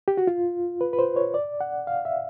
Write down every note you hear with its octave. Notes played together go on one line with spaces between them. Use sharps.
G4
F#4
F4
B4
B4
C5
C#5
D5
F#5
F5
E5